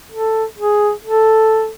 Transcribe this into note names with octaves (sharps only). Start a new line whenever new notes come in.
A4
G#4
A4